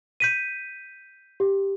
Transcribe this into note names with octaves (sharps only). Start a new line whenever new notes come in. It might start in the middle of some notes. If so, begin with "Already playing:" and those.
G6 B6 D#7
G4